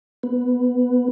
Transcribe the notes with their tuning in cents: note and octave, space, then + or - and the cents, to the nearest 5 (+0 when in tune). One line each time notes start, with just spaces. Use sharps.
B3 +5